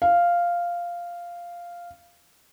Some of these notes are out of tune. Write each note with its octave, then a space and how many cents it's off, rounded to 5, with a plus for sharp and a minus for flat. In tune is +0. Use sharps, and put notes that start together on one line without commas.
F5 -5